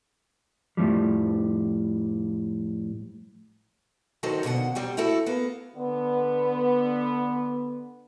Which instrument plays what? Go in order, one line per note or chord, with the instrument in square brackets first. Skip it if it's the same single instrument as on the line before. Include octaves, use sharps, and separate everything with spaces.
[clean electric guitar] F2 A2 C3 F3 G3
[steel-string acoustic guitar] D2 D#3 F#3 D#4 A4 C5
D#2 B2 D3 G#4 F#5
F#3 G3 C4 G5
A3 E4 F#4 A4
A#3 B3
[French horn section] D3 B3